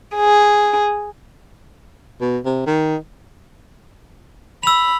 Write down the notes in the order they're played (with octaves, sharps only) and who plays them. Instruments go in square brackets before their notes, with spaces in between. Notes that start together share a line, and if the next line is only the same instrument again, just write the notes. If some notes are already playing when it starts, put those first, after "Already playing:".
[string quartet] G#4
[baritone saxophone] B2
C3
D#3
[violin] B5 [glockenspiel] E6 F7